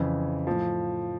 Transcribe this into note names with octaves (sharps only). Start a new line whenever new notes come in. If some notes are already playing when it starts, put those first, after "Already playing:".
Already playing: F2 C#3 E3
A2 F3